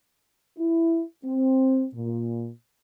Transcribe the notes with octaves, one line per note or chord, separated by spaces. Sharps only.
E4
C4
A#2